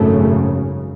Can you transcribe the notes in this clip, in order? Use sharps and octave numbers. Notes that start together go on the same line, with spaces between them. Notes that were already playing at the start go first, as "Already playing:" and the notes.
Already playing: G#1 F#2 A2 C#3 A3